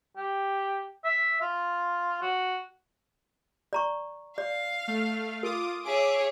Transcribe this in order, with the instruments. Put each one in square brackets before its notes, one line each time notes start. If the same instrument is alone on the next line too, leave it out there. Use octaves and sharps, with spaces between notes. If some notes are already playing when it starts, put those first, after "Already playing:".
[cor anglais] G4
E5
F4
F#4
[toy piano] D5 A#5 C#6
[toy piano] D5 [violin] F5
[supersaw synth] A3 F6
[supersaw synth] F4 D6 D#6 [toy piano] A#4
[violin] G#4 C#5 [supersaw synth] E5 D6 D7